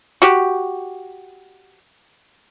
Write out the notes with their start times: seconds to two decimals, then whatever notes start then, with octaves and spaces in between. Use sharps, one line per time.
0.22 F#4 G4